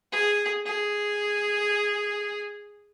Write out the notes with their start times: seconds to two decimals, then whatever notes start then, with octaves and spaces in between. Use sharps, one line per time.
0.12 G#4
0.66 G#4